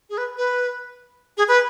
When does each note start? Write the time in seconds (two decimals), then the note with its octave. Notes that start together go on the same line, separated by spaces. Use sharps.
0.10 G#4
0.18 B4
0.38 B4
1.37 G#4
1.48 B4